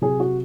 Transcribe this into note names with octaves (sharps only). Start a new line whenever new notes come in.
C3 F#3 G#4
F#4